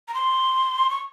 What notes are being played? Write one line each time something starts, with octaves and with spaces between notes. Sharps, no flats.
A#5
C6
C#6